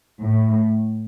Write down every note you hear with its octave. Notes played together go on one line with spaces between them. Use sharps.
A2